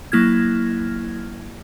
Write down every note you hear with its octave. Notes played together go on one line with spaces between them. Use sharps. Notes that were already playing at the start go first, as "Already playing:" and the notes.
F#3 A#3 E4 F6 G#6